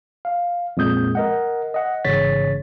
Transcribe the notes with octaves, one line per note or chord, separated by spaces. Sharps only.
F5
F2 A#2 G#3 D#6 G6
A#4 D#5 F#5
D#5 F#5
A1 G#2 C#3 C#5 A6 B6